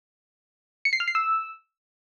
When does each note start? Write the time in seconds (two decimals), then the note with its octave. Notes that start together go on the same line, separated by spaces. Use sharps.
0.85 C#7
0.93 C7
1.00 F6
1.08 C7
1.15 E6